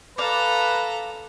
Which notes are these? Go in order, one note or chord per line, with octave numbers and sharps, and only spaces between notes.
A4 B4 D5 F5 A#5